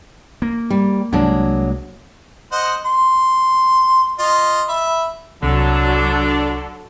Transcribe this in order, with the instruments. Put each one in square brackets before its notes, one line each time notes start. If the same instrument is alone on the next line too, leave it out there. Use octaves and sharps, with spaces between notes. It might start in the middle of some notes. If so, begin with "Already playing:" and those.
[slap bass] A#3
[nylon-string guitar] G3
[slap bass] C2 G#3 A#3 [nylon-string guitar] F#3 D4
[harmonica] C5 D#5 F#5
C6
F4 D#5
E5 B5
[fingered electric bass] C2 [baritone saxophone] D3 [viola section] F#3 A4 [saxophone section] D4